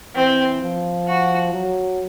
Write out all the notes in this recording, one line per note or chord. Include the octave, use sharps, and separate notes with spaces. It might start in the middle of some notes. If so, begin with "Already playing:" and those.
E3 C4
F3
F#4
F#3